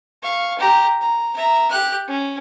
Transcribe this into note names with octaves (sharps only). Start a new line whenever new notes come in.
F5 C#6
G4 A#5
A#5
E5 A#5
G4 F#6
C#4